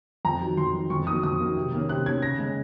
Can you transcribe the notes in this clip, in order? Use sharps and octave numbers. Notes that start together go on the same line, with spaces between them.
F2 A#5
D#3 F#3
F2 C6
D#3 F#3
F2 C#6
D#3 F#3 A#3 D#6
F2 D#6
D#3 F#3 A#3
C3
D#3 A#3 C#4
C3 F#6
D#3 A#3 C#4 G#6
C#3 A#6
G#3 C#4